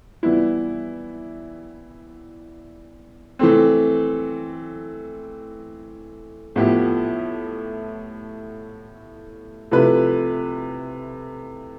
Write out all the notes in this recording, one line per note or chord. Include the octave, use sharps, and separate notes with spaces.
E3 G3 B3 E4
E3 A3 C4
A2 F3 B3 E4 G4
C3 F3 A3 E4 B4